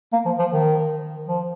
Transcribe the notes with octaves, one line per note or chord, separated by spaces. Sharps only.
A#3
F3
F3
D#3
F3